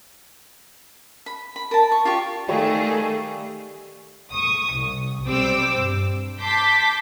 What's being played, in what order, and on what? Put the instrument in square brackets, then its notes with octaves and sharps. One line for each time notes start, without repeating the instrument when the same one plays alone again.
[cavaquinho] B5
B5
A#4 A5
C#6
F4 G4 D5 C#6
[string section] D#3 A3 G#4 [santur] G3 F5 C#6
[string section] C#6 D#6
C2
B1 G3 C4 D6 E6
G2
A5 C6 D6 G6 B6